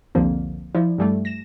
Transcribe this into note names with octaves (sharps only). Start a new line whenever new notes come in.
C2 F2 D3 F3 A#3 C4
F3 E4 D5
G2 G3 A3
A#6 E7